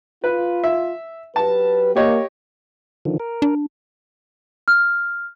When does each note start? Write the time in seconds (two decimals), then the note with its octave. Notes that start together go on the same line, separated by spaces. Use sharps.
0.24 F4 B4
0.64 E5
1.36 F#3 G4 B4 A5
1.96 A#3 G4 C#5 D#5
3.05 D3 D#3 F3
3.20 A#4
3.42 D4
4.68 F6